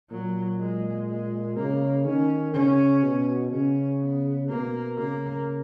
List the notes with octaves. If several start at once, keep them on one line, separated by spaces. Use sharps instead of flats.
A#2 F#3
G#3
G#3
C#3 A#3
D#3 C#4
C#3 C#4
B2
C#3 C#4
B3
B2 A#3
C#3 A#3